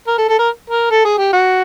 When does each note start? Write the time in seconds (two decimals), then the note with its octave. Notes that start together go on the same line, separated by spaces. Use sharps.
0.07 A#4
0.18 A4
0.29 A4
0.39 A#4
0.70 A#4
0.91 A4
1.05 G#4
1.18 G4
1.33 F#4